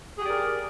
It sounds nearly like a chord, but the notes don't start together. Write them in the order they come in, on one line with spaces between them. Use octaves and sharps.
G#4 G4 D5 A#4